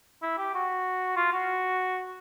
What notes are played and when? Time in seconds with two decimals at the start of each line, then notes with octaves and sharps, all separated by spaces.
0.22 E4
0.38 G4
0.55 F#4
1.16 F4
1.32 F#4